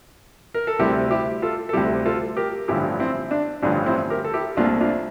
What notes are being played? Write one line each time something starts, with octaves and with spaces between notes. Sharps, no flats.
A#4
A4
D2 C3 G3 E4 G4
E4 G4
F4 A4
A4
D2 C3 G3 E4 G4
F4 A4
G4 A#4
A1 G2 D3 F3 E4 G4
C4 E4
D4
A1 G2 D3 F3 D4
C4 E4
G4 A#4
A4
E4 G4
C2 A#2 A3 D4 F4
D4 F4